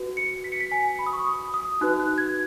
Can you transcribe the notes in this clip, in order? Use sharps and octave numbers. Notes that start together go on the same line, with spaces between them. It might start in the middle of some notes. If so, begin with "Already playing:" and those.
Already playing: F#4 B4
C#7
B6
C#7
B6
G#5
B5
D#6
C#6
D#6
D#6
D#4 F#4 B4 F#6
F#6
G#6